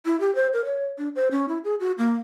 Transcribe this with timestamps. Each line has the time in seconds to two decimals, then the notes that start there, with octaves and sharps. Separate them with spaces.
0.06 E4
0.20 G4
0.35 C5
0.53 A#4
0.65 C#5
0.98 D4
1.16 C5
1.31 C#4
1.48 E4
1.64 G#4
1.80 F#4
1.98 A#3